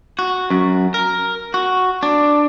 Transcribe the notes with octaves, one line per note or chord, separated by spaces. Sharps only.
F#4
F#2
A#4
F#4
D4